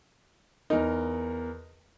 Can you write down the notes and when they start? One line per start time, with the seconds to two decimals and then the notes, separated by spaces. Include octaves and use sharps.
0.70 E2 D#4 A#4